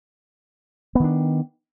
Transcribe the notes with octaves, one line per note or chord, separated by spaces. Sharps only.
D#3 B3 D4